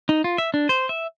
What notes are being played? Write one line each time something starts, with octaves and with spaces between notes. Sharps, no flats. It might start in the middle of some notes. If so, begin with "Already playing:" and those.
D#4
F4
E5
D4
C5
E5